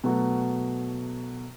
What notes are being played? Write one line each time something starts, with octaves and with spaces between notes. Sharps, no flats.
B2 F#3 A3 F#4